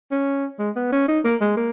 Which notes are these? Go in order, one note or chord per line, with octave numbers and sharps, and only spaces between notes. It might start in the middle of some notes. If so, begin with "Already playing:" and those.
C#4
G#3
B3
C#4
D#4
A#3
G#3
A#3